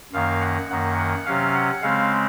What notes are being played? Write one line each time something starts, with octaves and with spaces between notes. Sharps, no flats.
F#2 D#3 A#3 F5
F#5
F#2 D#3 A#3 F#5
F#5
C3 F#3 C#4 F5
F#5
C#3 G#3 C4 F5